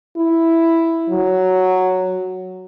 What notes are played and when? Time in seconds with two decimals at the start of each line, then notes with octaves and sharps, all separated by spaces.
0.17 E4
1.10 F#3